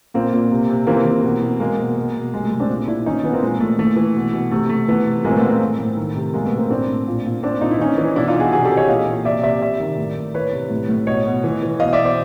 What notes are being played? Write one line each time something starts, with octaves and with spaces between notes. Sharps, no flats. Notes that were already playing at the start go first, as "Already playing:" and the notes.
A#2 A#3 C4
A#2
C3
C3
E3 A#3 C4
E3
B2
B2
B2 G#3 A#3
B2
B2
B2
C3 G#3
A3
C3 G#3
C4 D4
A#2
A#2 D4 E4
E3 C#4 D#4
E3 B3 C#4
A#3 C4
A#2 G#3
A#2 A3
E3 A3
E3
B2
B2
C3 A3
C3 A3
E3 A3 B3
C3
A#2 G#3 A#3
C4
A3 B3
A#2
A#3 C4
A2 A3
A2
D#3
C3
B2 G#3 A#3
A3 B3
B2
A#3 C4
A2 C4 D4
A2
A#2
A#2
A#2 C4 D4
A#2 D#4
E4
E3 C#4 D#4
E3
B2 D4 E4
D#4 F4
B2
F#4 G#4
C3 F#4 G#4
G4 A4
E3
C#5 D#5
A#2 D#5 F5
A#2
C3 D5 E5
C3 D5 E5
C3 D5 E5
D#3
A2
A2
E3 B4 C#5
C3
A2
A2
B2 C#5 D#5
B2
E3
E3
B2 D#5 F5
D5 E5
B2
C5 D5